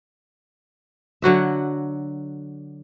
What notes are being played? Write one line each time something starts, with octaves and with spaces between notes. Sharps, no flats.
D3 F#3 F#4 E5